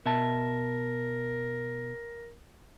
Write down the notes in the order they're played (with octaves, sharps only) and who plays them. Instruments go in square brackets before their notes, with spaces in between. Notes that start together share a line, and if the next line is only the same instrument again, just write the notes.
[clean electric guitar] B2 E5 A5 [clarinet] A#4